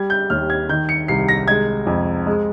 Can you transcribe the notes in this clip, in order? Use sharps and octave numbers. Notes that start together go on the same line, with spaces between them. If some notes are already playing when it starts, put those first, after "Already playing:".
Already playing: G3 G#6
G6
D#2 F6
G#6
D#3 G6
C#7
C2 C7
A#6
G#3 G#6
F2
G#3